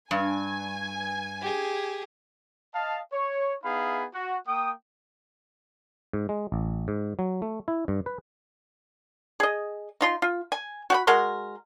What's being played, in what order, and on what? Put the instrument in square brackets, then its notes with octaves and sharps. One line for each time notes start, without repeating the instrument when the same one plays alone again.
[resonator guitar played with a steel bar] G2 [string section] G#5
[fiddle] G4 G#4
[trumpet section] D#5 F5 A5
C#5
B3 D#4 E4 G#4 F5 B5
F#4
A#3 G5 D#6
[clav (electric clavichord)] G#2
G#3
A1
G#2
F#3
A3
E4
G2
B4
[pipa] G#4 D#5
D#4 F4 C6
F4
G#5
F#4 F#5 B5
G#3 F#4 A#4 C6